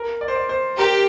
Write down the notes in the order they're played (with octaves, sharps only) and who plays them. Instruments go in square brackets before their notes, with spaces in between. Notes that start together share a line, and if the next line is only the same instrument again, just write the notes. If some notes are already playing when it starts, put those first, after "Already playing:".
Already playing: [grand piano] A#4
D5
C5
D5
C5
[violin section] G4 [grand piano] A#4